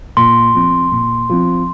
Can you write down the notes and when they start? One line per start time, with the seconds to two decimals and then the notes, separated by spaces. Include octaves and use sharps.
0.17 A#2 C6
0.54 F3 C4
0.92 A#2
1.29 F3 C4